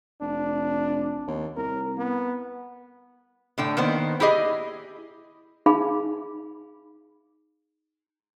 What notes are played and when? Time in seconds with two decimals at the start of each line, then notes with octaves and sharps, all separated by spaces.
0.21 F1 D4
1.28 D#2
1.57 C2 A#4
1.98 B3
3.58 A2 D3 G5
3.77 D#3 A#3 B3 C5
4.20 E4 G4 G#4 D#5
5.66 D#4 G#4 F5 B5